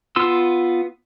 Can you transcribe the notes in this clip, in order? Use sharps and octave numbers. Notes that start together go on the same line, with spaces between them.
B3 F4 C6 E6